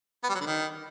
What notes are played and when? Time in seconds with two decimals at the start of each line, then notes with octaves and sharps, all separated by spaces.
0.24 B3
0.29 G3
0.35 F#3
0.40 D3
0.46 D#3